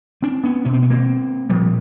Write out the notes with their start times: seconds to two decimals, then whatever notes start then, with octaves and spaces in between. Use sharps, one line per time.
0.22 C4 D4
0.44 B3 C#4
0.65 B2 C#4
0.73 C4
0.83 B3
0.90 A#3 C4
1.50 A#2 F3 G3